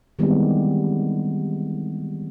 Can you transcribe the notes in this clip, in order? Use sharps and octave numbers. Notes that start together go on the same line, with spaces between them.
D#3 E3 G3 G#3 B3 C4